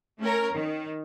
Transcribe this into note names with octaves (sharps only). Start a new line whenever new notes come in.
A3 C#4 A#4 C#5
D#3